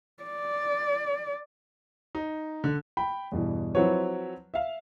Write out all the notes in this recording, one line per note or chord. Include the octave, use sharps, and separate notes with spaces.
D5
D#4
D3
G5 B5
E2 G2 B2 E3
F3 F#3 C4 E4 B4 C#5
E5 F5